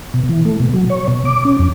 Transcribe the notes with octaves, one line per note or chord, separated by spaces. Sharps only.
B2
E3
A3
B2
F#3
C#5
B2
D6
C#4
F2